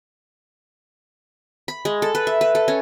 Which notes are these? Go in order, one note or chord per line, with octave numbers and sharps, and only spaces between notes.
B5
G#3
A4
B4
E5
B4
A4
C#4